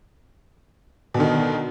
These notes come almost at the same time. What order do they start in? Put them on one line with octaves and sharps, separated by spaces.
B2 D3 D#3